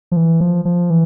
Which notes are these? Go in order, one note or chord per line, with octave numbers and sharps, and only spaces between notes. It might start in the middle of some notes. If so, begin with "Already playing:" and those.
F3
E3
F3
F3
E3